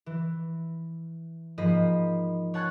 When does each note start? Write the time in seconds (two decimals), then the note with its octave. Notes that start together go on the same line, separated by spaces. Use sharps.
0.06 E3
1.58 G#2 F3 A#3 D#5 B5
2.54 C#5 F#5 A5 C#6 F#6 G#6